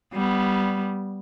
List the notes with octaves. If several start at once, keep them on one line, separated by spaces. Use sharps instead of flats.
G3 B3